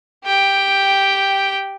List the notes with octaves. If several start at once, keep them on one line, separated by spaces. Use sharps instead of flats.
G4 G5